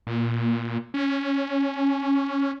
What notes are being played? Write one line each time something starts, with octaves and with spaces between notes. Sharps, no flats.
A#2
C#4